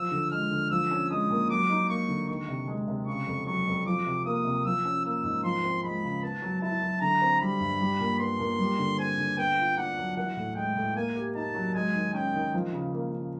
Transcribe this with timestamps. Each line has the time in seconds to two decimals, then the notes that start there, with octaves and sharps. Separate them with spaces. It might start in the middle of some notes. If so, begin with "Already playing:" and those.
Already playing: F3 E6
0.11 D3
0.31 G#3 F6
0.51 D3
0.70 F3 E6
0.91 C#4
1.10 G#3 D#6
1.30 A#2
1.50 F#3 D6
1.70 D#4
1.89 A#3 C#6
2.08 D3
2.29 D#3 C#6
2.48 C3
2.68 G#3
2.88 C3
3.07 C#3 C#6
3.27 F2
3.46 F#3 C#6
3.67 F2
3.86 F3 D6
4.06 C3
4.25 A#3 D#6
4.45 C3
4.65 F3 E6
4.85 C#4
5.04 A#3 E6
5.24 G#2
5.43 F3 C6
5.63 C4
5.83 G#3 B5
6.03 C#3
6.23 B3 A5
6.42 F#3
6.61 E4 A5
6.82 F#3
7.01 D3 A#5
7.22 C4
7.41 G3 B5
7.60 G2
7.80 G3
8.00 A#2
8.19 B3 C6
8.39 A#2
8.59 G3
8.79 D3
8.98 C4 G#5
9.18 D3
9.37 B3 G5
9.58 F4
9.77 D4 F#5
9.97 F#3
10.16 E3 F#5
10.37 A2
10.56 G#3 G5
10.76 A2
10.95 A#3 G#5
11.15 G4
11.35 D#4 A5
11.55 F#3
11.74 G#3 G#5
11.94 D#3
12.14 C#4 G5
12.34 D#3
12.54 F3
12.73 C#3
12.93 A#3
13.13 C#3